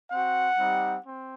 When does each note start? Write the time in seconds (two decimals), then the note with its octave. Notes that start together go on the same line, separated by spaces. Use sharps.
0.11 C4 F#4 F#5
0.59 G3 C4 D#4 G4
1.06 C4